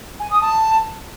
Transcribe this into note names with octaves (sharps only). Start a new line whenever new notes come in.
G#5
D#6
A5